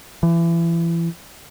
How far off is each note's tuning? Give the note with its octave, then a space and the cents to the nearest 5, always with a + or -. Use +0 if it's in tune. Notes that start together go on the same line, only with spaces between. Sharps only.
E3 +30